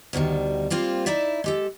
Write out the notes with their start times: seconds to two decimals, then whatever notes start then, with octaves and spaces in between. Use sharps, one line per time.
0.13 D2 B2 D#3 G3
0.70 G3 A#3 C4 F4
1.06 D#4 E4 D5 E5
1.44 G#3 G4 A4